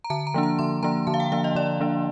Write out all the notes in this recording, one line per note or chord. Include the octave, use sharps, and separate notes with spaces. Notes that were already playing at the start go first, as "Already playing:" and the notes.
A#5
D3 A5
A#5
F3 A#3 D4
A#5
D3 C6
F3 A#3 D4 A#5
D3 A5
F5
G5
F3 A#3 D4 F5
D#5
D3 D5
F3 A#3 D4